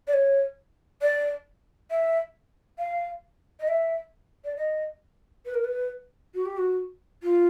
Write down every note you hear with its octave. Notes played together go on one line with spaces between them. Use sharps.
D5
C#5
D5
E5
F5
D#5
E5
D5
D#5
B4
A#4
B4
F#4
G4
F#4
F4